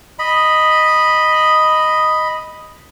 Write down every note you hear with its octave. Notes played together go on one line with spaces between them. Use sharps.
D#5 B5